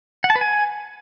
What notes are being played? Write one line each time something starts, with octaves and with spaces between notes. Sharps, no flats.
F#5
A5
B4
G#5